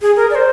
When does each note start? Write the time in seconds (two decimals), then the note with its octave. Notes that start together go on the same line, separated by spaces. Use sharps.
0.02 G#4
0.16 A#4
0.30 D5
0.35 C5